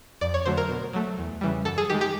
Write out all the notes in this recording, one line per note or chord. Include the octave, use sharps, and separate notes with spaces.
F2 D5
C#5
D3 F#3 A3 C5
A#4
B2
F#3 A3
E2
C#3 E3 G3
F#2 A4
G#4
D#3 G#3 G4
G4